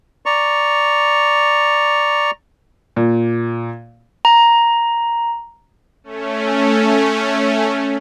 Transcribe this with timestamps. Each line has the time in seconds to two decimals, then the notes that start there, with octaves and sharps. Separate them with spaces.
0.26 D5 A#5 C#6
2.96 A#2
4.25 A#5
6.04 A3 C#4